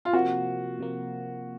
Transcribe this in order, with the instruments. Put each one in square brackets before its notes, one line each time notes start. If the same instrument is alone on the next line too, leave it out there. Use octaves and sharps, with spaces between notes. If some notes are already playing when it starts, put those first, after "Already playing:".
[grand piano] F4
[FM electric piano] C3 F3 A#3 [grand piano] F#4
[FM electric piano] C3 F3 A#3